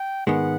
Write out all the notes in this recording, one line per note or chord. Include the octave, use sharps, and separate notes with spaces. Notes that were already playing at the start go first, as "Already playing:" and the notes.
Already playing: G5
G#2 D#3 G#3 B3 F#5